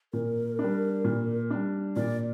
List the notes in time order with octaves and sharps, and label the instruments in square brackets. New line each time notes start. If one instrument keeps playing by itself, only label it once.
[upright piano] A#2 [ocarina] A#4
[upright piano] G3 D4
A#2
G3 D4
[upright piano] A#2 [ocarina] D5